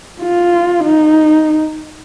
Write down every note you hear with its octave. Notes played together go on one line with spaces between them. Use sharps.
F4
D#4